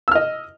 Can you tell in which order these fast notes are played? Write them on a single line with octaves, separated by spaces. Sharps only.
E6 F6 D#5